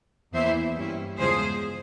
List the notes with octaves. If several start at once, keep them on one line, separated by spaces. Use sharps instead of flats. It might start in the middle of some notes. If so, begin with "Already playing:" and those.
E2 E3 A#3 E4 C5 E5
G2 G3 C#4 E4
E2 C#3 F3 G#3 G#4 C5